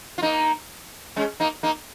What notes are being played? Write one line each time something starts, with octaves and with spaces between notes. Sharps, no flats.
F4
A#3 D#4
G#3 C#4
A#3 D#4
A#3 D#4